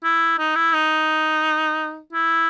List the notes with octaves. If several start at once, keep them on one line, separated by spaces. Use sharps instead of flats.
E4
D#4
E4
D#4
E4